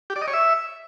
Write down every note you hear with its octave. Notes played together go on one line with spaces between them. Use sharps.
G4
D5
D#5
C#5
E5